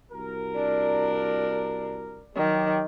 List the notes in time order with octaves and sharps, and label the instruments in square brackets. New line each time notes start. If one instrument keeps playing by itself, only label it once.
[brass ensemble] C2 F#4 A#4
[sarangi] D4
[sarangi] D#3 [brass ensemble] F#3 G4